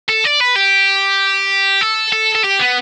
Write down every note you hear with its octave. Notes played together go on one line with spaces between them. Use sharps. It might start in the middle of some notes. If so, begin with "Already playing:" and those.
A4
D5
B4
G4
A4
A4
A4
G4
B3